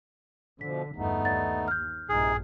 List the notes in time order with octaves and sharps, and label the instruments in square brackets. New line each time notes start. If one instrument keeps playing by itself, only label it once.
[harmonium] B2 F3 [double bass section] D3 [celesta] B6
[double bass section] G1 E2 [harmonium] A3 B3 D#4
[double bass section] D#2 [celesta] D5 F#5 A6
[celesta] F6 G6
[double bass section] A#1 G2 [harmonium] C3 D#4 [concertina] G#4